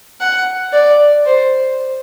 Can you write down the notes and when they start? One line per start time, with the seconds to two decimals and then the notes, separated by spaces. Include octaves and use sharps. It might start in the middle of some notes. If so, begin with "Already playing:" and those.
0.20 F#5
0.73 D5
1.26 C5